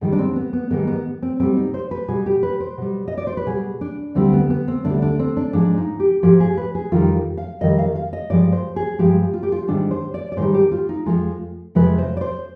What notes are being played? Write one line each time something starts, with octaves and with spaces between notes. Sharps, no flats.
G#2 D#3 G3
D4
C4
B3
B3
G#2 D#3 G3 B3
B3
C4
B2 G3 C4
D#4
C5
B4
B2 G3 G#4
G4
B4
C5
B2 G3
D#5
D5
C5
B4
B2 G3 G#4
D4
D2 D3 G3 C4
B3
B3
C4
D2 D3 G3 D4
D4
C4
D4
G#2 F3 G#3 D4
D#4
G4
G#2 F3 G#3 G4
G#4
B4
G#4
F2 D#3 G3 F4
F5
F2 D#3 G3 D#5
F5
F5
D#5
G2 F3 G#3 D5
C5
G#4
G2 F3 G#3 G4
F4
G4
F4
G#2 D#3 G3 D4
C5
D5
D5
G#2 D#3 G3 C5
G4
F4
D#4
F2 C3 F3 G#3 F4
F2 C3 F3 G#3 B4
C5
D5
C5